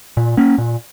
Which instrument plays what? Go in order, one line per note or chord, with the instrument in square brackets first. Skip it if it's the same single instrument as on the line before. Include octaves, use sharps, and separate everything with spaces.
[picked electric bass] A#2
A#3 C#4
A#2